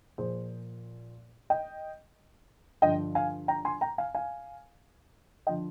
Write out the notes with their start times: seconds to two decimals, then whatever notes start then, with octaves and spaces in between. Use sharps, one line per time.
0.18 A#2 F3 G#4 C5
1.50 D#5 G5
2.82 G2 D3 F3 D#5 G5
3.15 F5 G#5
3.48 G5 A#5
3.65 G#5 C6
3.81 G5 A#5
3.98 F5 G#5
4.15 F5 G#5
5.47 D3 F3 D#5 G5